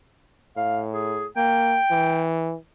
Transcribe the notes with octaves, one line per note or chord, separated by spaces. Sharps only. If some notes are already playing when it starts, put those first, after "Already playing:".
A2 F5
G#4
A#3 G5
E3